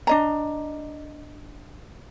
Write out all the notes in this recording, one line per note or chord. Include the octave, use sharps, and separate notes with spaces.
D4 D#5 A#5